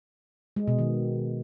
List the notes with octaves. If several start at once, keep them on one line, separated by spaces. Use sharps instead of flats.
G#3
B2
D#3